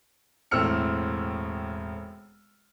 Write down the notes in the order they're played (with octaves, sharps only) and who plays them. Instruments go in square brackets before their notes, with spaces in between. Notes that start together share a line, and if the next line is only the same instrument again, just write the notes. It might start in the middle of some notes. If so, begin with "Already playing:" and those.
[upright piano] E1 A2 C4 E6 F6 C#7